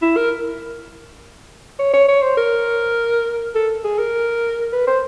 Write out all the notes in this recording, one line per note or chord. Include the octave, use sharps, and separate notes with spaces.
E4
A#4
C#5
C#5
C#5
C5
A#4
A4
G#4
A#4
B4
C5